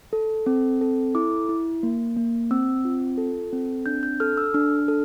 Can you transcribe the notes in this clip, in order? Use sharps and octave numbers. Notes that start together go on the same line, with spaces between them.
A4
C4
A4
E4 D6
E4
A#3
A#3
C4 E6
F4
A4
C4
D4 G6
G6
A4 F6
E6
D4 F6
A4